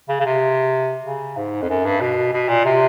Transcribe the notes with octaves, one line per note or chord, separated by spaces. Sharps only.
C#3
C#3
C3
C#3
G#2
F2
F#2
G2
B2
B2
A#2
C3